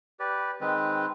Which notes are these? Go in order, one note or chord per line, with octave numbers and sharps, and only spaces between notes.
G4 B4 D5
D#3 G#3 C4 B4